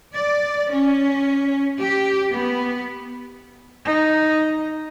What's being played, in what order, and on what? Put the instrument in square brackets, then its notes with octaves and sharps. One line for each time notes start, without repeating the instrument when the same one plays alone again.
[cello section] D5
C#4
G4
B3
[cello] D#4